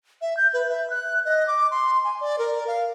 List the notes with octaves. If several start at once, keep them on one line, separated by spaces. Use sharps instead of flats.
E5
G6
B4
E5
F#6
D#5
D6
C6
G#5
D5
A#4
F5